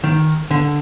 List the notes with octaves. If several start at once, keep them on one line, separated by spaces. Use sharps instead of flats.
D#3
D3